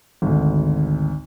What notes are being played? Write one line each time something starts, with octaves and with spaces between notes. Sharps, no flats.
G#1 D2